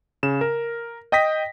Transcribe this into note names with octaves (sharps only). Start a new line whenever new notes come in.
C#3 E7
A#4
D#5 G5 D#6 A#6 B6